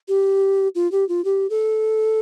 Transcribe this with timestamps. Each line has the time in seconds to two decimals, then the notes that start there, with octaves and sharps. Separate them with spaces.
0.08 G4
0.75 F4
0.92 G4
1.09 F4
1.25 G4
1.50 A4